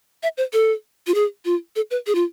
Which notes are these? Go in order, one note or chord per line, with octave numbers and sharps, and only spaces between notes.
E5
C5
A4
F4
G#4
F4
A4
B4
G#4
F4